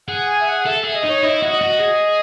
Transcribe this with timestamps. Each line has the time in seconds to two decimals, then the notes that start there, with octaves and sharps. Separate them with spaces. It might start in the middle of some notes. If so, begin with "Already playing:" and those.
0.08 G#4 F#5
0.27 G#5
0.41 E5
0.47 F#5
0.66 A4 E5
0.80 G#4 E5
0.94 D#5
1.04 D#4
1.09 C#5
1.23 E4 D#5
1.43 F#4
1.52 D#5
1.61 F#4
1.80 G#4